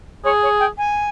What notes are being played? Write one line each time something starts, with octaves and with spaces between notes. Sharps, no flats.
G#4 C#5
C#5
G5
G#5